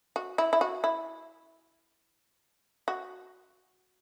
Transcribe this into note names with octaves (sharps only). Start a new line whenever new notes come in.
F#4
E4
E4
F#4
E4
F#4